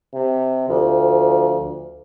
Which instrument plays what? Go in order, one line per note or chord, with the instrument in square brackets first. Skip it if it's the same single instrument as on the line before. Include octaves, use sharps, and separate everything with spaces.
[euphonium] C3
[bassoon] D2 [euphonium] F3